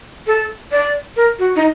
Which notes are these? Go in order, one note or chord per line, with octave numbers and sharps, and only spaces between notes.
A4
D5
A#4
F#4
D#4